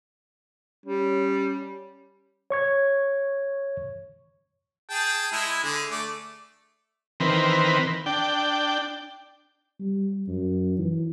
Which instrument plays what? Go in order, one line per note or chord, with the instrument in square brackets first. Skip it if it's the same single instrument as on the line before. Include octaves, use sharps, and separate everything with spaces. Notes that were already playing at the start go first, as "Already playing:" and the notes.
[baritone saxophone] G3 [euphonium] C#4
[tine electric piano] C#5 C#6 G#6
[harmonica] G#4 G5 A5
G#3 E4
D3 G#4
A3 D5
[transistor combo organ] D#3 E3 C4 A#4 B4
D4 G5
[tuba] G3
F#2
E3